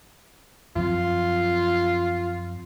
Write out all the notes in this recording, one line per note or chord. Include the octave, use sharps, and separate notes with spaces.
F#2 F3 C4 F4